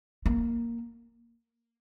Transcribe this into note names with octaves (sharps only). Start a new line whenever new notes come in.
A#3